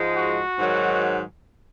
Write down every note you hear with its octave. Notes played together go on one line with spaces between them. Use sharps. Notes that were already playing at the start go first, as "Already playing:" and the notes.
Already playing: G#2 F3 G#3 D#4
F#4
G#2 D#3 F#3